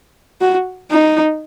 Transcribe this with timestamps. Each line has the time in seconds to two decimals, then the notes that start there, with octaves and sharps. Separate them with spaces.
0.41 F#4
0.90 D#4